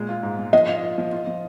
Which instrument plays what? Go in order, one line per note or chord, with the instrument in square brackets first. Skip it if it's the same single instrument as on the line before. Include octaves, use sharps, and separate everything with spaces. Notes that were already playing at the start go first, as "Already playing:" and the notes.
Already playing: [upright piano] A#2 G#3
F4
G#2
G#3
[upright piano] F3 [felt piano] D#5
[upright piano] F4
F4
F3
F4
F3